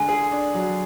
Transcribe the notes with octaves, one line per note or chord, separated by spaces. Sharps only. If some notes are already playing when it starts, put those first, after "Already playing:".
Already playing: D3 G#3 G#5
G#4
D4
F#3